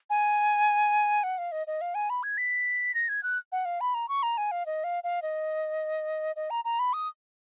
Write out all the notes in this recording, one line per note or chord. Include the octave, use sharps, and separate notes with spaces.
G#5
F#5
F5
D#5
D#5
F5
G#5
B5
G#6
B6
A#6
G#6
F#6
F#5
F5
B5
A#5
C#6
A#5
G#5
F5
D#5
F5
F5
D#5
D#5
A#5
A#5
B5
D#6